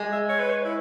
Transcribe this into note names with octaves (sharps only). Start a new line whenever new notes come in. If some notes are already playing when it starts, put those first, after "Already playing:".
Already playing: G#3
E5
C#5
B4
C#5
E4